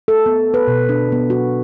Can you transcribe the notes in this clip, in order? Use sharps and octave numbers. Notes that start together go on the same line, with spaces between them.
A4
B3
B4
B2
D4
B3
F#4